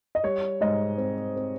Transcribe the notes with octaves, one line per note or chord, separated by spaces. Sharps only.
D#5
G3 C#5
G#2 D#5
C4
C4